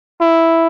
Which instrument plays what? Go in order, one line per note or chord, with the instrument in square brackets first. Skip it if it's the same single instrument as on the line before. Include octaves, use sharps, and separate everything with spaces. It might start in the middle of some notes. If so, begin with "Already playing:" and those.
[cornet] E4